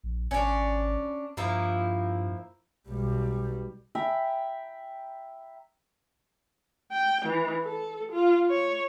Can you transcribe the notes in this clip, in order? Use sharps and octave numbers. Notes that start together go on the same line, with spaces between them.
A#1
G#1 C#4 D4
G2 F3 A#3 E4
B1 G3
E5 G5 A#5 B5
G5
E3
A4
F4
C#5